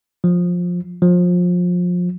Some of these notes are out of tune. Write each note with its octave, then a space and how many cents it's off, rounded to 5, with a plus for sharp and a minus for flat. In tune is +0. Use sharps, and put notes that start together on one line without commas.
F3 +15
F3 +25